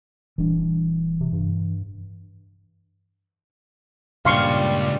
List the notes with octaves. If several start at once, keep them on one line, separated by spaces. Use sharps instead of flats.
D#1 E3 G3 D4
C3
G2
C#2 G2 A#2 G3 F5 C6 C#6